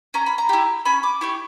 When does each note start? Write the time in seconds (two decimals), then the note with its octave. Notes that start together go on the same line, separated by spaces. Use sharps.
0.14 C#4 A#5
0.26 B5
0.38 A#5
0.49 E4 G4
0.85 C#4 B5
1.03 D6
1.21 E4 G4 C#6